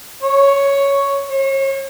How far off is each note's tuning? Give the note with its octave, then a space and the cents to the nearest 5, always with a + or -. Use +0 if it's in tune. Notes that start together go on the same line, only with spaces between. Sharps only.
C#5 +5
C#5 -40